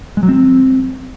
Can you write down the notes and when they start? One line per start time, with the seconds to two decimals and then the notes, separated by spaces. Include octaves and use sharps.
0.17 G#3
0.23 F#3
0.29 C4